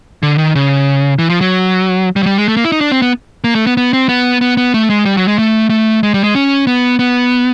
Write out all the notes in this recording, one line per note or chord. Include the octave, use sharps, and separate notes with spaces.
D3
D#3
C#3
E3
F3
F#3
G3
F#3
G3
G#3
A3
A#3
E4
D#4
D4
C4
B3
A#3
A3
B3
B3
C4
B3
B3
B3
A3
G#3
G3
F#3
G#3
A3
A3
G#3
G3
G#3
C#4
B3
B3